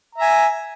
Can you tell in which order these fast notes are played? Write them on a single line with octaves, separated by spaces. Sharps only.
A#5 E5 G#5